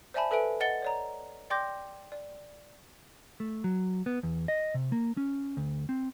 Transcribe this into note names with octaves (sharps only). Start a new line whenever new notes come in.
C5 D5 E5 G#5 A5 B5
A4 B4 E5 G#5 D7
D#5 F#5 A6 C#7 G7
C#5 D5 A#5
D5 G5 C6 D6 G6 A#6
D5
A3
F#3
B3
E2
D#5
C3
A#3
C#4
D2
C4